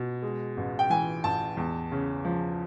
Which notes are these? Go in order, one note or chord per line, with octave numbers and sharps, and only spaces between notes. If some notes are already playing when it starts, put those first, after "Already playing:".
Already playing: B2
G#3
A1
G5
E3 G#5
A1 A5
E2
C#3
F3